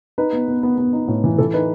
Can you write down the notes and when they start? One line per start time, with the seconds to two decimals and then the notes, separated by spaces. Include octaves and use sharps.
0.18 D#4 B4
0.33 B3
0.48 B3
0.63 B3
0.78 B3
0.93 D#4
1.08 A2
1.24 E3
1.38 E3 A4
1.54 D#4 B4